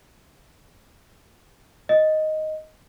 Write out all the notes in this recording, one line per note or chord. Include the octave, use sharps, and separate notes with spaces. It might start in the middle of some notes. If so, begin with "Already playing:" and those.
D#5